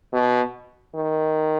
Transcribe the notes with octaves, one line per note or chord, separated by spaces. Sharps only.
B2
D#3